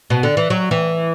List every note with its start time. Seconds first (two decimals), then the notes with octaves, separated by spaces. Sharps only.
0.10 B2
0.23 D3
0.37 E3
0.50 F#3
0.71 E3